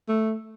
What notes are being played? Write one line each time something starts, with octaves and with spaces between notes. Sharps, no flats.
A3